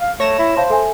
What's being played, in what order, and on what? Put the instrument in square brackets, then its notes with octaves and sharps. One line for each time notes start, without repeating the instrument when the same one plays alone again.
[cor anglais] F5
[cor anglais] A3 [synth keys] C#5 A#6 E7
[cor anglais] E4
[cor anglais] C5 [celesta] F5 A5 C6
[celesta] A4 E5 G#5